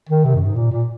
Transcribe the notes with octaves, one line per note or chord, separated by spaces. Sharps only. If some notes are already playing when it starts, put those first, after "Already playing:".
D#3
C3
F#2
G#2
A#2
A#2